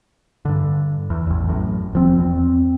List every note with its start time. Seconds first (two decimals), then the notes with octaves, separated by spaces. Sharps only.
0.45 G2 D3
1.10 E2
1.27 A1 E2
1.47 A1 F#2 A2
1.93 E1 F3 C4
2.18 E2 C4